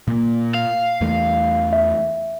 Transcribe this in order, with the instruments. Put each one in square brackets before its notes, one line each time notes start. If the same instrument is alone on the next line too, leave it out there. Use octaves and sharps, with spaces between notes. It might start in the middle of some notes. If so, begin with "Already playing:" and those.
[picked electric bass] A#2 A#3
[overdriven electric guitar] F5
[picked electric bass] E2 E3 A3
[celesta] E5